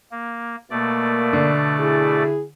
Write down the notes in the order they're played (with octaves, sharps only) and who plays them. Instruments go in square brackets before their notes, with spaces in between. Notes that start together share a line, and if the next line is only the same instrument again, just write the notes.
[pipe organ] A#3
[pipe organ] B2 A3 D5 [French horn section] A#3
[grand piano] D3
[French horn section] E4 G#4